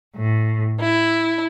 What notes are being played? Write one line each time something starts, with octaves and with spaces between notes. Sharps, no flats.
A2
E4